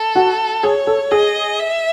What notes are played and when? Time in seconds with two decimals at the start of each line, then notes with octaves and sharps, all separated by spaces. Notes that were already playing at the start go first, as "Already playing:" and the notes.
Already playing: A4
0.15 F#4
0.63 G#4 C#5
0.87 A4
1.11 G#4 D#5
1.59 E5